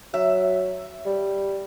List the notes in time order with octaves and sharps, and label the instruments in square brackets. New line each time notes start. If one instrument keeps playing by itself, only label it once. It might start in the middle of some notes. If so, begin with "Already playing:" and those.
[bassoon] F#3 [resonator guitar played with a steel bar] E5
[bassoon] G3